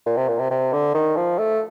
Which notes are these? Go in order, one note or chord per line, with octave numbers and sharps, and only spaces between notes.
A#2
C3
A#2
C3
C3
D3
D#3
F3
A3